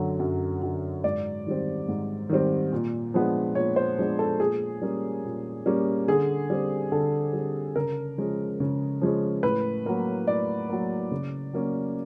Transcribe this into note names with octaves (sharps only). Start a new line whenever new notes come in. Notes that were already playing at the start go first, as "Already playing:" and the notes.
Already playing: F#2 D3 F#3
F#2
D3 F#3
G#2 D5
D#3 G3 C4
G#2
D#3 G3 C4
A#2
F3 G#3 B3 D4
A#2 C#5
C5
F3 G#3 B3 D4
A4
A#2 G#4
G3 A#3 C#4
A#2
G3 A#3 C#4
D3 G#4
G3 C4
D3 A4
G3
C4
C#3 A#4
F3 G#3 C#4
C#3
F3 G#3 C#4
A2 B4
F#3 A#3
A2 D5
F#3 A#3
C#3
F#3 A#3 C#4